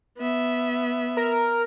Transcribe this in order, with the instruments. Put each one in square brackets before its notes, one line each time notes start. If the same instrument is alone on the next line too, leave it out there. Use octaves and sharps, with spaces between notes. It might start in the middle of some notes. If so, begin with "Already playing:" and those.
[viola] B3 E5
[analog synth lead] A#4